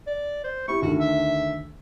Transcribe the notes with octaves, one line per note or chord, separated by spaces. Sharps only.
D5
C5
E4 G4 C#6
D2 D#3 A3 F#4
E5